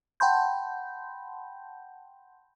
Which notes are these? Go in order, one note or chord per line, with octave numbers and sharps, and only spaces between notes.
F#5 G5 A5 B5 C6 G6